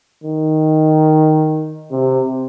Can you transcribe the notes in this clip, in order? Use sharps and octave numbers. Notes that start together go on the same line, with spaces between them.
D#3
C3